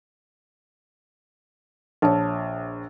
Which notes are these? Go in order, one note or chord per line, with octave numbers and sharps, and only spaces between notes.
A#1 C#5 A5